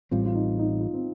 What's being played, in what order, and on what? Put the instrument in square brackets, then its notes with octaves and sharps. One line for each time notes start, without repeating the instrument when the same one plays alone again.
[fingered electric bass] A1 A2 G3 C4 [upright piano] F4
[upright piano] F4
D#4
D#4
F4
C4